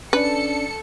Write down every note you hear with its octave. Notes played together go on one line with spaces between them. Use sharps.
C#4 D4 A4 B4 D5 C#7